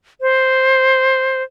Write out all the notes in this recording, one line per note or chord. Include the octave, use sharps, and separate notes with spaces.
C5